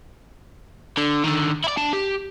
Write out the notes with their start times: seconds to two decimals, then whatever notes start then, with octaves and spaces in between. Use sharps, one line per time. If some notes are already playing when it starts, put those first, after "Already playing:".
0.97 D3
1.24 D3 D#3
1.64 E4 D5
1.77 D4 A5
1.93 G4